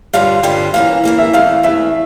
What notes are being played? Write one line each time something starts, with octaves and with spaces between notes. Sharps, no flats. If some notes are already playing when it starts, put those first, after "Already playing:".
G2 D3 G3 C#4 F4 F5
G2 D3 G3 C#4 F4 G5
E3 A#3 C#4 F5
E3 A#3 C#4
E5
E2 E3 A3 F5
E2 E3 A3 E5